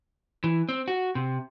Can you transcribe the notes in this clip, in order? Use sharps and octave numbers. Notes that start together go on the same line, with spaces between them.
E3
C4
F#4
C3